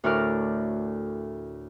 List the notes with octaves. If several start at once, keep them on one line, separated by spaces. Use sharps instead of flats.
D2 A2 F#4 A#4 D5 F6